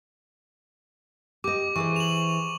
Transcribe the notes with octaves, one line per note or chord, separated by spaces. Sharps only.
G4 D#5 D6
E3 G#4 C5 C#6
F7 F#7